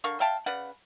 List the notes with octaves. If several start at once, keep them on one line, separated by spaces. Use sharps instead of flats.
D3 A#4 F5 C#6
E5 F5 G5 A5
C#3 B4 D5 F#5